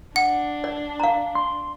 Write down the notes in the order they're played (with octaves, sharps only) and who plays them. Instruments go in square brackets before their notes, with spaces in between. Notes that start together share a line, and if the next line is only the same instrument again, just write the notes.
[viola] D4 [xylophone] F#5
[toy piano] D5
F5 A#5
[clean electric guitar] C6